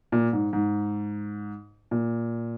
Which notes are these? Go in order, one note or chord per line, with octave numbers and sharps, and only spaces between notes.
A#2
G#2
G#2
A#2